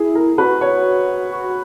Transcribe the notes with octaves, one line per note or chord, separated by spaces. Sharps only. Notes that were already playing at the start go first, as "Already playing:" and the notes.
Already playing: E4 G#4
A#4
F#4 B4
C#5
F#4